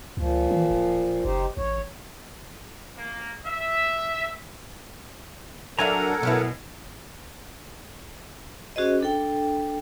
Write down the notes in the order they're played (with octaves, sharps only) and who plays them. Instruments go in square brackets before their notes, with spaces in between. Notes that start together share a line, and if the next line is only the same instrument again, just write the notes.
[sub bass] C#2 [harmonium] A#2 F3
[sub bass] E3
D1
[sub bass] F#1 [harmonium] D#4 G4 C5
[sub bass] A1 [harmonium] C#5
[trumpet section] A#3
E5
[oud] F#3 D4 E5 [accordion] A4 A#4 F#5 [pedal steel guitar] G#5 A#5
[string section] B2 [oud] F#3 B3 E4
[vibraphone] C#4 F#4 G#4 C5 D#5
D4 A4 G5